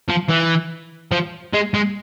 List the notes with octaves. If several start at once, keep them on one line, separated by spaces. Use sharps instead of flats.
F3
E3
F3
G#3
G#3